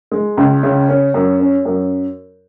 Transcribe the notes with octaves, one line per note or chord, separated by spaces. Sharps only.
G#3
C#2
C#3
C#4
F#2
C#4
F#2